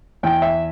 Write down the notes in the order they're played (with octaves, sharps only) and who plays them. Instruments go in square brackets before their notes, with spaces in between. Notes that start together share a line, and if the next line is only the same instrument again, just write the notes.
[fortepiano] E2 G5
E5